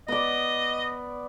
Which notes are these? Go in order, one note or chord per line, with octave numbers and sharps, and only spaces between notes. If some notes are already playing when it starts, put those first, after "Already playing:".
B3 D5 D#5